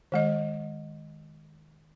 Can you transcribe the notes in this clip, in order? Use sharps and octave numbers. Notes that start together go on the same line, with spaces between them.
D#3 G#3 D#5